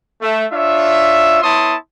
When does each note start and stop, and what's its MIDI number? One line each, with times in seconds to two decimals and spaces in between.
0.21 0.45 57
0.21 0.45 76
0.51 1.41 62
0.51 1.41 65
0.51 1.41 73
0.51 1.41 76
1.42 1.75 59
1.42 1.75 64
1.42 1.75 73
1.42 1.75 81
1.42 1.75 84
1.42 1.75 87